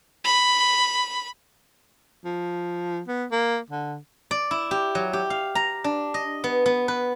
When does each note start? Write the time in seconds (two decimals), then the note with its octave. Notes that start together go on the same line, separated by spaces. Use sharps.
0.25 B5
2.25 F3
3.08 B3
3.31 A#3
3.70 D3
4.31 D5
4.51 E4
4.71 G4
4.95 F#3
5.13 G4
5.30 F5
5.55 A#5
5.84 D4
6.14 D#5
6.44 B3
6.66 B3
6.88 B4